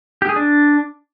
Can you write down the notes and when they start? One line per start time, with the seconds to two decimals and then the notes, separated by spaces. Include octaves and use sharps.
0.22 G4
0.29 G#4
0.36 D4